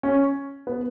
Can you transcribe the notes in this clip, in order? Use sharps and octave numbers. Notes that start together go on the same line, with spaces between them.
C#4
B3